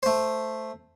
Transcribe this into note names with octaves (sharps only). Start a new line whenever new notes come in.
A3 C5